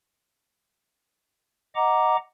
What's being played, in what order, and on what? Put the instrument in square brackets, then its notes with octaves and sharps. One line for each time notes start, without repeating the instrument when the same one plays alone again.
[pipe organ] D#5 F#5 A#5 D6